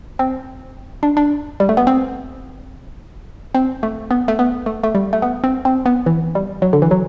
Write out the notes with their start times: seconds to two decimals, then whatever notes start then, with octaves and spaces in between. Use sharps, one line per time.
0.19 C4
1.03 D4
1.17 D4
1.60 G3
1.69 A3
1.77 B3
1.87 C4
3.55 C4
3.83 A3
4.11 B3
4.28 A3
4.39 B3
4.66 A3
4.83 A3
4.95 G3
5.13 A3
5.22 B3
5.44 C4
5.65 C4
5.86 B3
6.06 E3
6.35 G3
6.62 F#3
6.73 D3
6.82 E3
6.91 F#3